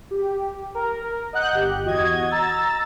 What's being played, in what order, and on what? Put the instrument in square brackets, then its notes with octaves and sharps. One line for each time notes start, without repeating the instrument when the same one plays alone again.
[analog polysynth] G4
A#4
D#5 F#5 F#6 G6
G1 G4
E2 F#4 D#5 G#6
A#5 E6 A6